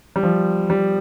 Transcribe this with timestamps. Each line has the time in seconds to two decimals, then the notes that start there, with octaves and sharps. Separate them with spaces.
0.16 G3
0.23 F3
0.70 G3